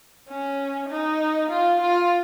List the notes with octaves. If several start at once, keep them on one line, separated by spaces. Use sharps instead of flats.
C#4
D#4
F4
F4